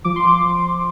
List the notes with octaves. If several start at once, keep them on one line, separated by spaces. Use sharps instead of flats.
F3 D6
C6
F3 D6